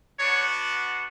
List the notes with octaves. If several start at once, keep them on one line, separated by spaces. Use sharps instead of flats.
B3 D4 F#4 C#5